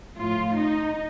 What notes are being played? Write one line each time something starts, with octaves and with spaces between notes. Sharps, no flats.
A2 F3 A3 F4
D#4